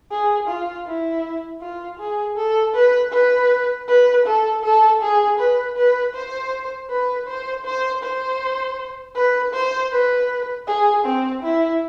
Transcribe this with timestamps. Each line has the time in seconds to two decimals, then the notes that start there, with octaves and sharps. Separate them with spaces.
0.11 G#4
0.48 F4
0.86 E4
1.61 F4
1.99 G#4
2.37 A4
2.75 B4
3.13 B4
3.88 B4
4.26 A4
4.64 A4
5.02 G#4
5.39 B4
5.77 B4
6.15 C5
6.90 B4
7.27 C5
7.65 C5
8.03 C5
9.16 B4
9.53 C5
9.92 B4
10.68 G#4
11.05 C4
11.43 E4